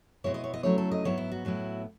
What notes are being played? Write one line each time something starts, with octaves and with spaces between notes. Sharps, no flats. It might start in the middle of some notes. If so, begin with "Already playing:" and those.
B2 G#3 B3 E4 C#5
D#5
C#5
D#5
C#3 F#3 A3 C#4 E4 C#5
A4
D#5
G#2 F#3 B3 E4 C#5
E4
F#4
A2 F#3 B3 E4